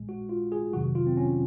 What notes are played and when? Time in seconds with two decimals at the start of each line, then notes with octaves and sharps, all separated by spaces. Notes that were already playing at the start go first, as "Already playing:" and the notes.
Already playing: A#1 A#2 G#3
0.09 F#4
0.29 F4
0.52 G#4
0.73 F2 C3 D#3 F#3 F#4
0.95 F4
1.07 C4
1.17 C#4